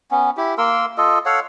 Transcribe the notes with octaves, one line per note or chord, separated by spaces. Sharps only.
B3 C#4
E4 G4
A#3 A#4 C6 E6
F4 A4 D#5
A4 C#5 F5 F#5